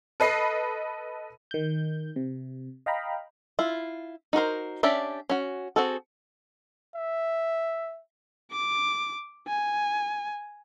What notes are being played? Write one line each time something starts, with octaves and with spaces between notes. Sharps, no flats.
A4 B4 D#5 C7
D#3 G6
C3
D#5 F5 G5 A#5 B5
E4 F4
D#4 F#4 A#4 C5
C#4 D4 G4 D5 E5
C#4 F#4
C4 F#4 G#4 A4
E5
D6
G#5